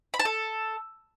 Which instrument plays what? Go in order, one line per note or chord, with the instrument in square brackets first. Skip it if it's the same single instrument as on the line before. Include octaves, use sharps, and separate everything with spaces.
[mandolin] B5
A5
A4